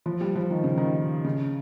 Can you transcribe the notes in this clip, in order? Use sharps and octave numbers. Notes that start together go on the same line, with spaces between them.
F3
G3
F3
D#3
C#3
D#3
C#3